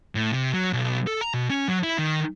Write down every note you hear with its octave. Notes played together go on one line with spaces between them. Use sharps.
A2
C3
F#3
B1
A4
A#5
B2
C#4
F#3
E4
D#3